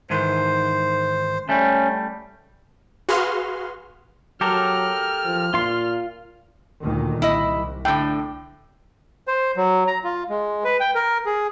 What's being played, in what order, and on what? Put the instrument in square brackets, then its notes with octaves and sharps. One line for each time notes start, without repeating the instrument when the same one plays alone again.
[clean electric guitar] G#2 D#3 E3 [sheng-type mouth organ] C5
[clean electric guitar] G3 A3 [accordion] C#4
[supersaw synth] F#4 G#4 B4 F5 C6 F6
[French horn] F#3 [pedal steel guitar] G4 A4 A#4 [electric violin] F6
[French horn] F3
[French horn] A#2 [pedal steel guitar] F4 C6
[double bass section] D2 A#2 D#3
[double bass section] C2 [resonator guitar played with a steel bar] E4 D#5
[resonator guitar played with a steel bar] A2 D3 [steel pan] G5
[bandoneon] C5
F#3
A#5
F4
G#3
B4
G5
A#4
G#4